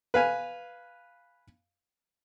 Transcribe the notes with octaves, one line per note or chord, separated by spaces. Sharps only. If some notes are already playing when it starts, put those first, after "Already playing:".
B4 F5 G#5